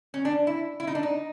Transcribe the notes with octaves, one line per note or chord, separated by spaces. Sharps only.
C#4
D4
E4
E4
D#4
D4
D#4